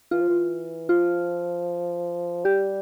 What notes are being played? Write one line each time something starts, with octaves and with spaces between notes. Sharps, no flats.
E3 F4
F3
E3
F3 F4
G3 G4